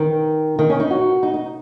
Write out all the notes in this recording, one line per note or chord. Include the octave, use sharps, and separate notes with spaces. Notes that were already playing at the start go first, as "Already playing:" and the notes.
Already playing: D#3
D#3
C#4
D#4
F#4
D#4
D#4